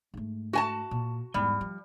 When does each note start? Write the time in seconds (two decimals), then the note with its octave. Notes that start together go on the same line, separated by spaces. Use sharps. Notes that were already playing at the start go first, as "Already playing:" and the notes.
0.14 G#2 A3
0.53 F#4 G#5 A5
0.91 A#2
1.34 E2 G#2 G3
1.61 F3